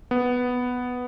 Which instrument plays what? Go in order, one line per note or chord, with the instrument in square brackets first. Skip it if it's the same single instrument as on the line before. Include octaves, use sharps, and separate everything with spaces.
[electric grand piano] B3